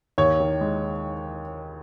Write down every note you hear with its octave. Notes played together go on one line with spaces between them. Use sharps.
D#2 C#5
D#3
G#3